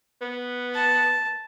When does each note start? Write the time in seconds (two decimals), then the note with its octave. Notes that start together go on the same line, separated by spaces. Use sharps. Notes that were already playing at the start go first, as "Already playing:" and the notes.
0.21 B3
0.74 A5